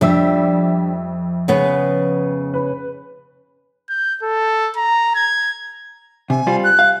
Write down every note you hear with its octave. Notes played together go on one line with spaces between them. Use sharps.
F2 G3 D4 E5 E6
C#3 B3
B4
G6
A4
A#5
G#6
C3 G#5
G3 F4 C5
F#6
F5